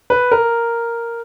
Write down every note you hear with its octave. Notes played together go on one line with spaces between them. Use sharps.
B4
A#4